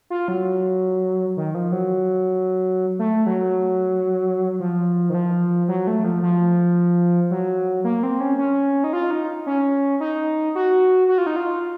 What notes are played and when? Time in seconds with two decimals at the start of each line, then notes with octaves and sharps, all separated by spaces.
0.10 F4
0.28 F#3
1.37 D#3
1.55 F3
1.72 F#3
2.99 A3
3.26 F#3
4.60 F3
5.10 D#3
5.14 F3
5.68 F#3
5.87 A3
6.04 F3
6.23 F3
7.31 F#3
7.84 A#3
8.03 C4
8.20 C#4
8.38 C#4
8.84 D#4
8.93 F4
9.11 D#4
9.46 C#4
10.00 D#4
10.55 F#4
11.09 F#4
11.18 F4
11.26 D#4
11.36 F4